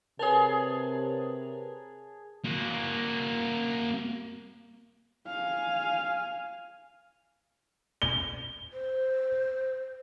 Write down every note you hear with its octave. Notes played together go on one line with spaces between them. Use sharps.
C3 G#4 A#4 B4 C#5 A5
A#3 F#4
F5 G#5
G7
C5